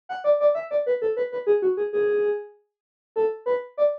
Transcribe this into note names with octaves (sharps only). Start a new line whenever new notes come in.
F#5
D5
D5
E5
D5
B4
A4
B4
B4
G#4
F#4
G#4
G#4
A4
B4
D5